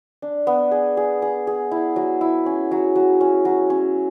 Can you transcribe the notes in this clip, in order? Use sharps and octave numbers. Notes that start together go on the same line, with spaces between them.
D4
B3
G#4
G#4
G#4
G#4
E4
F#3
E4
C#4
F#3
F#3
C#4
F#3
C#4